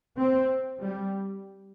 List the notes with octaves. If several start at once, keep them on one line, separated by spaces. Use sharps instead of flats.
C4
G3